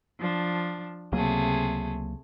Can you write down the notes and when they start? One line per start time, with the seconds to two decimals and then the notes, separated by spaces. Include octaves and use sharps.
0.20 F3 D4
1.12 C#2 C3 F#3 A3 A#3 G#4